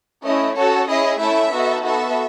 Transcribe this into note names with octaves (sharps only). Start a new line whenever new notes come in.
A3 C#4 E4 D#5
C#4 F#4 A4 C#5
C#4 E4 G#4 D#5
A3 C#4 E4 A4 E5
B3 D#4 F#4 A4
B3 F#4 A4 E5